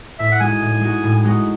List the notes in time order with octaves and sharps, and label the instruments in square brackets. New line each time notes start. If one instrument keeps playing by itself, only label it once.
[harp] A2 [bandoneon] E5
[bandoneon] F#5
[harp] G#3 D#4 F#4 [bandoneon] G#5
[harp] A2
G#3 D#4 F#4
A2
G#3 D#4 F#4